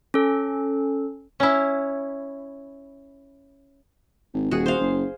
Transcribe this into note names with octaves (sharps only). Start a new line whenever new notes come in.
C#4 A4
C#4 E4
G#1
D#1 F#4 G#4
C5 F5
F#1